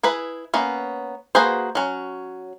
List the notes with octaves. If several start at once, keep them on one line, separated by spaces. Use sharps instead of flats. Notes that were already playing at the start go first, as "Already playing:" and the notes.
E4 G#4 B4
A#3 B3 C#4
A#3 F#4 G#4 B4 C5
F#3 C#4